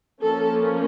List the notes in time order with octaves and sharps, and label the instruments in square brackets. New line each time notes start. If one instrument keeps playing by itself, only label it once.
[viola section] F3 A#3 C#4 A4